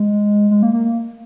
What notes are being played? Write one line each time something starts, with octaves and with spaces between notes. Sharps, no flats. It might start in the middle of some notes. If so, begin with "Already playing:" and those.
Already playing: G#3
G#3
A#3
A#3
A#3